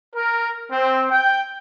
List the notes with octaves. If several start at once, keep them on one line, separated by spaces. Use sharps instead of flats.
A#4
C4
G5